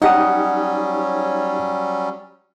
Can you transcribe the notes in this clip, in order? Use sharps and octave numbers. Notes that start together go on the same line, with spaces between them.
F#3 G3 C#4 D#4 G4 D#5 F#5 D#6